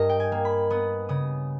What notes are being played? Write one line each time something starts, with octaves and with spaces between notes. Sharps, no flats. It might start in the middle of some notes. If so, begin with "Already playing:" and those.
Already playing: G2 A#4 D#5
G5
G#5
A#3
B5
B3 D#6
C#3 D#6